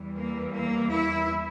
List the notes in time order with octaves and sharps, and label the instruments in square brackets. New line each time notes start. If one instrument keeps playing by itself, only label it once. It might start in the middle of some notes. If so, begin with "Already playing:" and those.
Already playing: [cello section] E2 E3 G3
A#3
A#3
E4